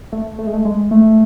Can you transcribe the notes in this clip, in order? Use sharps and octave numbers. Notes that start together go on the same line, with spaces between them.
A3
A3
G#3
A3
G#3
A3